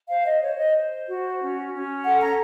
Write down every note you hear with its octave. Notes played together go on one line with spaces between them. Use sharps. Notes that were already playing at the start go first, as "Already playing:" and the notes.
C5 F5
D#5
C5 C#5
D#5
C5
F#4
C#4
C#4
A4 F#5
A#5